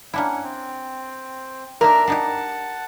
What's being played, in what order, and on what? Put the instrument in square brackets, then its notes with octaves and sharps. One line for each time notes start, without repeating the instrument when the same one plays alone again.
[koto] A#3 D4 E4 [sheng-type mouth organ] C#4 F#5
[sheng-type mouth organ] C4
[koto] A#3 D#4 [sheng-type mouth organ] D4 E5 [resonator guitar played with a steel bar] A#4
[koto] D4 D#4 G4 [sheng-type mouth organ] F#5 A5